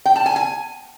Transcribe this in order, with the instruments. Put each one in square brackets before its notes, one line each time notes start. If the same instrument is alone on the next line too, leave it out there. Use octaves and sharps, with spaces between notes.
[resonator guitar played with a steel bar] G5
A5
G#5
G#5